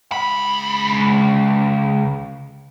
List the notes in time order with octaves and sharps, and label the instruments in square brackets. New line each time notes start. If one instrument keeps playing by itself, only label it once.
[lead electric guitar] C#2 B5